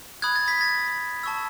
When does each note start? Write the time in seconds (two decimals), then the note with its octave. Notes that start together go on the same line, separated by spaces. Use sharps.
0.22 B5 D#6 F#6 G#6
0.36 A6
0.48 G#6 B6
0.61 A6
1.23 A5 C#6 E6